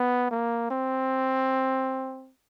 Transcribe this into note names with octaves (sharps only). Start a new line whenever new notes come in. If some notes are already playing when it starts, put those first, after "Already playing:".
Already playing: B3
A#3
C4